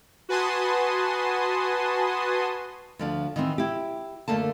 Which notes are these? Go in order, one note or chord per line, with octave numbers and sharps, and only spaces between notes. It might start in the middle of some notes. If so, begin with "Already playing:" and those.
F#4 B4 G#5 A5 C6 D#6
D2 F3 D4
D#3 E3 C4
E4 G4
F#2 D3 A3 A#3 A5